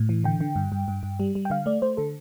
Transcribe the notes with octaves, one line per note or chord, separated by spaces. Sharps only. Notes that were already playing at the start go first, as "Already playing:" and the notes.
Already playing: A2
E3
D3 G5
D3
G2
G2
G2
G2
G3
G3
G5
D3 F5
A3 D5
A3 C5
D3 A4